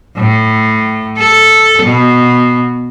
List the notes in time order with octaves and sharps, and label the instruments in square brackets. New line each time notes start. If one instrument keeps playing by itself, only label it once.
[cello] A2
A4
B2